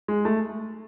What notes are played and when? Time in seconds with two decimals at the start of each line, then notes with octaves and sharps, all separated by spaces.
0.08 G#3
0.25 A3